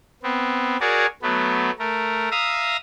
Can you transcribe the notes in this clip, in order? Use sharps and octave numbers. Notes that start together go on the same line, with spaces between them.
B3 C4
F#4 G#4 A#4 C#5 D5
F#3 A3 B3
A3 A#4
E5 F5 A#5 D#6